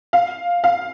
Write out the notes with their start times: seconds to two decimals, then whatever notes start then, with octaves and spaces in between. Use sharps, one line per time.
0.13 F5
0.64 F5